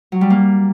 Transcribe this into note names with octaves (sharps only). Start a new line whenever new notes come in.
F#3
G3
A#3